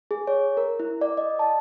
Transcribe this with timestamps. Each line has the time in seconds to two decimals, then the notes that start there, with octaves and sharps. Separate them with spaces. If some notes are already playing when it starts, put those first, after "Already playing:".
0.11 G#4
0.27 C#5
0.57 A#4
0.80 E4
1.01 D5
1.17 D#5
1.39 A5